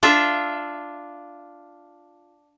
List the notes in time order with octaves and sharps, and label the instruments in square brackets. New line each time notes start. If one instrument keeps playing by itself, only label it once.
[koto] D4 F4 E5